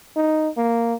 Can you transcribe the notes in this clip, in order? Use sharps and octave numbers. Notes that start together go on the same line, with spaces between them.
D#4
A#3